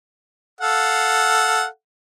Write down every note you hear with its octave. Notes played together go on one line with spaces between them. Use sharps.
A4 F5 F#5